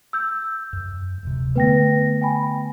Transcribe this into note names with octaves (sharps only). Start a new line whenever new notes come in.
E6 G6
F#2
D1 C3
D3 A3 B3 B4 G5 A#6
G5 G#5 B5